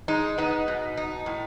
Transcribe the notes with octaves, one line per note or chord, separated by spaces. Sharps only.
G#3 D#4
B3 D#4
B2
D#4
A2